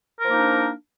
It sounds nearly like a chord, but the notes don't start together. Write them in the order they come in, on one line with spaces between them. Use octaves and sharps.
A#4 F3 A#3 D#4 D4